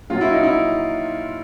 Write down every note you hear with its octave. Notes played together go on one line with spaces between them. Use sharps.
A#2 F#3 F4
E4
D#4
E4